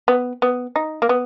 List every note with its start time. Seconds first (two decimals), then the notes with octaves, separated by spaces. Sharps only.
0.08 B3
0.42 B3
0.76 D#4
1.02 A#3
1.09 B3